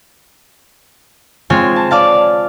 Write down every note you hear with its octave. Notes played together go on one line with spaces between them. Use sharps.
G#3 C4 F4 C#5 G#5
A5
D5 F5 A5